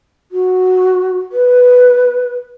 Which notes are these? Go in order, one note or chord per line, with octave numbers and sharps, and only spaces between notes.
F#4
B4